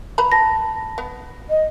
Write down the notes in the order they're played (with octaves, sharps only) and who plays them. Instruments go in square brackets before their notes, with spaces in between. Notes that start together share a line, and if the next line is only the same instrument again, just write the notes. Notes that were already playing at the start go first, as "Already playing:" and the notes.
[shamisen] B4 A#5 B5
[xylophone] A5 A#6
[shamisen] B3
[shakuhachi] D#5